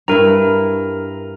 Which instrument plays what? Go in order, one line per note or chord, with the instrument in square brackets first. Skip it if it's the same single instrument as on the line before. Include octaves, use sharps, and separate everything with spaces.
[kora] G2 E4 [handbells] A#4 A#5